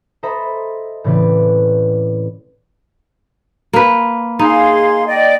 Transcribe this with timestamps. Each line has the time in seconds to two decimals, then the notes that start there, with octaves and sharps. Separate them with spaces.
0.23 A4 C5 D#5 E5 A#5 B5
1.04 A2 C#3 E3 C4 B4 D5
3.73 A#3 B4
4.39 D#4 G#4 F5 C6
5.06 D5 D#5 G5